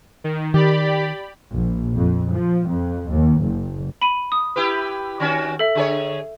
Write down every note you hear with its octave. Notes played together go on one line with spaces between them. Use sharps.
D#3
D#3 G4 D5 B5
A#1
F2
F3
F2
D#2
F#1
B5 D#7
D#6
E4 G4 B4
D#3 C#4 F#4
A4 E5
D3 G#4 C#5